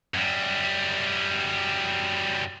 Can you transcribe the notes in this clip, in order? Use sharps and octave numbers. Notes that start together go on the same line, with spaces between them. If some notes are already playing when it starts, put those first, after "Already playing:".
F#2 G3